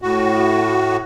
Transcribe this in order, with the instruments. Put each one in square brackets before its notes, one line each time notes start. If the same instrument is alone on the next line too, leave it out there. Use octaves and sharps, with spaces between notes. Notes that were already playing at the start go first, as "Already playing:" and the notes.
[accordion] A2 F#4